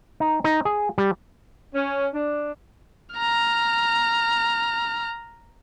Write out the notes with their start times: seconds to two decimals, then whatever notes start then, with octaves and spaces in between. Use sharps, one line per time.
0.20 D#4
0.44 D#4
0.65 G#4
0.98 G3
1.73 C#4
2.12 D4
3.16 A#5 F6